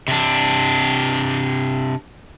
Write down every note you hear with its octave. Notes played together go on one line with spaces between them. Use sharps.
C3 D4